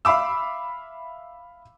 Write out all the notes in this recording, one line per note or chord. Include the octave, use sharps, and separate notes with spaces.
E5 F5 B5 D6 E6